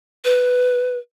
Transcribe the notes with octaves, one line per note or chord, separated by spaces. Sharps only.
B4